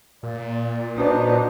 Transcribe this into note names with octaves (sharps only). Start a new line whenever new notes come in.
A#2 D5
D4 D#4 F#4 B4 C5